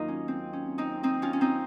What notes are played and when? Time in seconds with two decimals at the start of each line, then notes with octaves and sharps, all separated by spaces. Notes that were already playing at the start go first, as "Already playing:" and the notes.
Already playing: D#2 D#3 F#3 D#4 F4 D#5
0.08 C#4
0.28 C4
0.53 C#4
0.78 C4 D#4
1.03 C4 D#4
1.22 C#4 F4
1.33 C#4
1.41 C4 D#4